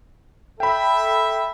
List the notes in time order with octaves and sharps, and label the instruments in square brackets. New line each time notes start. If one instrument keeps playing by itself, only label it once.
[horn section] A4 E5 [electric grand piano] G5 B5